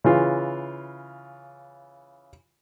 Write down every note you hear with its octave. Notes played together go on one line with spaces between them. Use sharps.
C#3 E3 F4